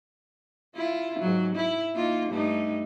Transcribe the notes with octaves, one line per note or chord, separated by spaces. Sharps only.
E4 F4
G#2 F#3
E4
A#3 D#4 F4
G2 A3 D#4